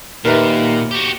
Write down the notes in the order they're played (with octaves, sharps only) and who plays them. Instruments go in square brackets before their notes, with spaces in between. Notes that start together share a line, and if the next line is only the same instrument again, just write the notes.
[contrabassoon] D#2 [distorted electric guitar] A#2 [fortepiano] A#4 B4 E5
[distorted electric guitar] F#4 G4